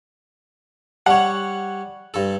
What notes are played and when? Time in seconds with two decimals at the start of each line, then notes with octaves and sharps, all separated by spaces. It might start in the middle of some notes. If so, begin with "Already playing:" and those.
1.06 G3 C#5 F#5
2.14 G2 A4